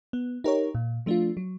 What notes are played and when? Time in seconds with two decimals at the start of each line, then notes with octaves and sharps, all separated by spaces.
0.13 B3
0.44 D#4 G4 A#4 C#5
0.75 A#2
1.06 F3 A3 D4 F4
1.37 F#3